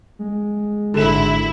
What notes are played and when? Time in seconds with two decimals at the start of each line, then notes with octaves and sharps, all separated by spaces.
0.19 G#3
0.94 G#1 D3 E4 E7